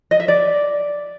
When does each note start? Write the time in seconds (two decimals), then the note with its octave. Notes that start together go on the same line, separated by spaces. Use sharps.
0.11 D#5
0.20 E5
0.28 D5